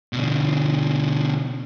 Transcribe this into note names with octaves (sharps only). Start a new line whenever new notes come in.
B2 D3